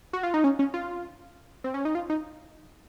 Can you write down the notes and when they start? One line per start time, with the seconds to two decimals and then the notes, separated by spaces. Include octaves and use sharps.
0.13 F#4
0.23 F4
0.34 D#4
0.44 C#4
0.59 C#4
0.74 F4
1.64 C4
1.74 C#4
1.85 D#4
1.95 F4
2.10 D#4